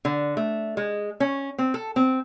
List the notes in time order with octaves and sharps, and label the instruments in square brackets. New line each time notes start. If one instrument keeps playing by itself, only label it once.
[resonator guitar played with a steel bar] D3
A3
G#3
C#4
C4
A4
C4